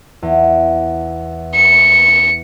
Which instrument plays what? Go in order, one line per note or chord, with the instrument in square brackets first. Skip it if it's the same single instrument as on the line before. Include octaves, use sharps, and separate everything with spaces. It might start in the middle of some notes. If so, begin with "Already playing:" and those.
[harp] E2
[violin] C#7